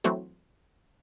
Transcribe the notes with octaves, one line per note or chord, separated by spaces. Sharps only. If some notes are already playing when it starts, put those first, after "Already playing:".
E3 F#3 A3 C4 F#4